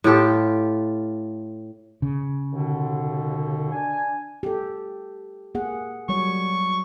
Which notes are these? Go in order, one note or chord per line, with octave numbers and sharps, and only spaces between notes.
A2 F4 G4 A4
C#3
D#2 B2 D3
D4 G#5
G4 A4
A#3 G#4 F#5
F#3 G3 C#5 C#6